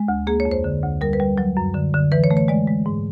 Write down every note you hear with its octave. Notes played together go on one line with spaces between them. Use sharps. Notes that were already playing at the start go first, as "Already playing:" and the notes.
Already playing: G#3
D2
A#3 G#4
C#5
F2
C5
D3
D2
G3 A#4
B4
G3
F#3
F#2
D3
D3
E3 B4
C#5
A3
C#5
G#3 D5
G#3
G#2